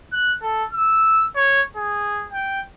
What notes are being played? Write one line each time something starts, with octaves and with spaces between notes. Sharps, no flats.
F#6
A4
E6
C#5
G#4
G5